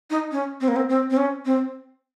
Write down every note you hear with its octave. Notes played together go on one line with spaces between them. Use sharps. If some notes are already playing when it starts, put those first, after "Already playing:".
D#4
C#4
C4
A#3
C4
C4
C4
C#4
C4